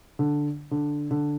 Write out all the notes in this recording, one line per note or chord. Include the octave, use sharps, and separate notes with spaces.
D3
D3
D3